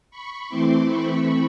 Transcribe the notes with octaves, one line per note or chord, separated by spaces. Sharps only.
B5 C#6
E3 A3 C4 E4 C6 D6
B5 C#6